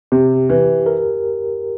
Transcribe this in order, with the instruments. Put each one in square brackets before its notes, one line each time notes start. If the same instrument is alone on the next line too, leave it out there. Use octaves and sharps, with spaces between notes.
[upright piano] C3 [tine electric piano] G4
[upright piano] E3
[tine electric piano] A#4